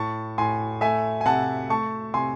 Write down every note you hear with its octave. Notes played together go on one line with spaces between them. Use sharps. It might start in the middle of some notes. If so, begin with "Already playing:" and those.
Already playing: A2 A5 C#6
A2 G#5 C6
A3 E5 G#5
G#5
C3 F#5 A5
A3 A5 C#6
C3 G#5 C6